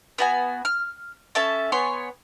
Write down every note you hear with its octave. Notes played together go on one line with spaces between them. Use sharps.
B3 F#4 G#5
F6
C#4 A4 E5 A5
B3 C#5 G#5 C6